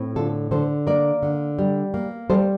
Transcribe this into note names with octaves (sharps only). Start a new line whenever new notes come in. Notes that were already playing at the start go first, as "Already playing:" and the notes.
Already playing: A2 C4
D3 F4 A4
D3 A4 C5
A#3 A#4 D5
D3
G3
A#3
G3 A4 C5